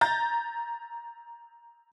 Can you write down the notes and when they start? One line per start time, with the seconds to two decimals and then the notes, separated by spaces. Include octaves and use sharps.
0.01 A#5 G6 A6